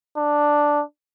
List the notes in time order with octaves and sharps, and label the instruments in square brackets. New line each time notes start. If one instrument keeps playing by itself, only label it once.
[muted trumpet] D4